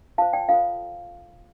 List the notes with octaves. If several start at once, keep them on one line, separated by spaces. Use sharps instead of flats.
F4 C5 F5 A5
D5 G5
F4 A4 C5 F5